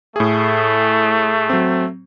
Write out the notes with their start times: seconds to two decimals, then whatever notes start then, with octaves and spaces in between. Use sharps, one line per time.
0.16 A2 A3 G#4
1.50 F#3 C4